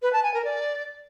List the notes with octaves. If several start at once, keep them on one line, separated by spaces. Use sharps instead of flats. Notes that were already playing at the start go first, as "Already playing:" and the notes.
B4
A5
G#5
A#4
D5